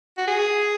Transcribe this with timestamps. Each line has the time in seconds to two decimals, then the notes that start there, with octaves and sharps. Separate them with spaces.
0.18 F#4
0.27 G#4